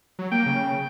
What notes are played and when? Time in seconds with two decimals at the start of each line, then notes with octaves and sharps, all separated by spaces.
0.19 F#3
0.32 A#3 G5
0.46 C#3